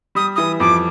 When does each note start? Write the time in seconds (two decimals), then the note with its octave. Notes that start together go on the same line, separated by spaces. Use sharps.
0.15 G3 D#6
0.35 E3 D#6
0.60 F2 D6